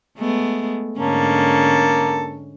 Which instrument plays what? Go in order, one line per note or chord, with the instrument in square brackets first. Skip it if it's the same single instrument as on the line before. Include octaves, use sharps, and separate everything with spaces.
[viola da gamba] G#3 A3 B3
[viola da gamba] G#2 D3 C#4 [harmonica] A#3 A4